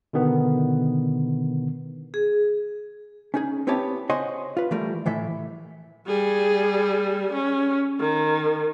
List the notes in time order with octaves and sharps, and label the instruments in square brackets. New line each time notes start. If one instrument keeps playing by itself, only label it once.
[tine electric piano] B2 D3 D#3 B3
[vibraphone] G#4
[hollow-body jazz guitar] C#4 D#4 G#4
B3 C4 E4 G4 C#5 A5
C5 C#5 D#5 F#5 G#5 C6
F4 B4
E3 G3 A3 A#4
A2 E3 A4 E5
[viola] G3 G#4
C#4
D#3